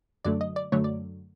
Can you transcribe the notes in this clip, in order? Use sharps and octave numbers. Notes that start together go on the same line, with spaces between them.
F#2 D3 F#3 A3 D5
D#5
D5
F#2 D3 F#3 A3 C#5
D5